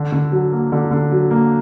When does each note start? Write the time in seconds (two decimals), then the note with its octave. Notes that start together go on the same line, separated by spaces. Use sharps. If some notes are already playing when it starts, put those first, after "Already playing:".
Already playing: D3
0.12 D3
0.32 F#3
0.52 A#3
0.72 D3
0.91 D3
1.11 F#3
1.31 A#3